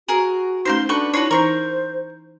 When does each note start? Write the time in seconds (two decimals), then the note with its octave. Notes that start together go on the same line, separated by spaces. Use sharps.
0.08 F#4 G#4 A#4
0.65 A3 C#4 D#4 C5 F5 C6
0.89 D4 F#4 A4 B4 C#6
1.13 D#4 E4 F#4 B4 C#5
1.31 E3 D#4 A#4 C5 C#6